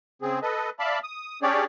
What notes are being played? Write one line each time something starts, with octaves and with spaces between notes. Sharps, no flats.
C#3 C4 G#4
A4 B4 D#5
D5 E5 F5 A5 B5
D#6
C#4 D4 G4 G#4 C#5 D5